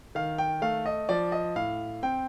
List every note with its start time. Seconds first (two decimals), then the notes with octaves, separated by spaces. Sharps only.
0.15 D#3 F5
0.38 G5
0.62 A3 F5
0.86 D#5
1.09 F3 D5
1.32 D#5
1.56 A2 F5
2.03 C4 G5